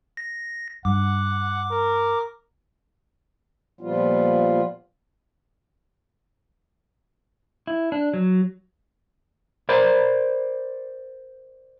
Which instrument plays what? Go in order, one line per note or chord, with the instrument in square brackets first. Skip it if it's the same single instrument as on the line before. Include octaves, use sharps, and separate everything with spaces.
[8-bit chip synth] A#6
[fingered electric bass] G2 [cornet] F#5 [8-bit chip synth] D6
[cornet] A#4
[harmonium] A#2 F3 G3 B3 F4
[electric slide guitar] E4
D4
F#3
[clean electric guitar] A#4 C5 D5 B5